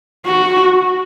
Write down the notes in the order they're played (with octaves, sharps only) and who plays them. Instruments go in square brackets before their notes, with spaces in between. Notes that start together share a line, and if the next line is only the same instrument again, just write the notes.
[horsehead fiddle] F#4